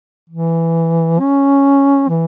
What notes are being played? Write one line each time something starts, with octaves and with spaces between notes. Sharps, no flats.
E3
C#4
E3